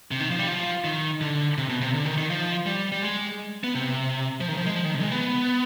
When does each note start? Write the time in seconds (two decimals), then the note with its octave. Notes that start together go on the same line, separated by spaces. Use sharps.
0.11 C3
0.20 D#3
0.30 F3
0.39 G3
0.48 F3
0.84 D#3
1.21 D3
1.58 C3
1.69 B2
1.81 C3
1.94 D3
2.06 D#3
2.18 D#3
2.30 F3
2.66 G3
2.92 G3
3.02 G#3
3.64 B3
3.75 C3
4.40 F3
4.48 D#3
4.57 F3
4.66 G#3
4.75 F3
4.85 D#3
4.94 C3
5.02 G#3
5.12 B3